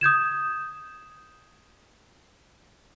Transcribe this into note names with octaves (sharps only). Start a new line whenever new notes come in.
D#6 G6 G#6 E7